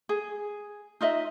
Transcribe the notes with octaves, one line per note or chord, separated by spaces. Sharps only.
G#4
D#4 F4 D#5 E5